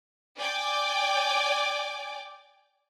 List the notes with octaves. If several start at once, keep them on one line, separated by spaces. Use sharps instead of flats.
D5 G5 G#5 D6